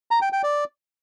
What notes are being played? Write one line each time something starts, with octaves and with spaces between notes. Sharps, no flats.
A#5
G5
G5
D5